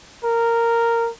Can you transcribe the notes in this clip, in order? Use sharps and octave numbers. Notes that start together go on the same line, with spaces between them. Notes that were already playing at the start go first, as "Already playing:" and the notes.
A#4